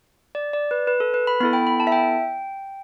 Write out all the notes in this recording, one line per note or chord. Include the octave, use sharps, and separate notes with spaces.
D5
D5
B4
B4
A4
B4
B5
B3 E4 A4 B5
G5
B5
A5
E5
G5